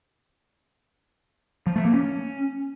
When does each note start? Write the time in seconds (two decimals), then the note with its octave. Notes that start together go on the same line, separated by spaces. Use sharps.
1.66 F3
1.76 A3
1.85 A#3
1.94 C#4